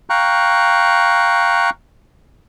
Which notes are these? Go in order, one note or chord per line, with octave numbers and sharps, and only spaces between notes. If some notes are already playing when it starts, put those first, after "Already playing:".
F5 G5 A#5 C#6 F#6